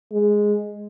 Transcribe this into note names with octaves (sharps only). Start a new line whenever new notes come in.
G#3